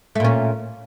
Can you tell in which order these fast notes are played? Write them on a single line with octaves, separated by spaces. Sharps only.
A3 A#2 C#4